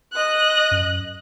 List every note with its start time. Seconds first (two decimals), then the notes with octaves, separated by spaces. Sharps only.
0.13 D#5 F#6
0.71 F#2